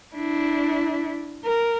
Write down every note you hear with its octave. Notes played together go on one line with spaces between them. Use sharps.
D4 E4
A#4